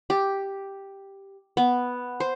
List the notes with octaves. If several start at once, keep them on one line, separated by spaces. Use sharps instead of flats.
G4
B3
C5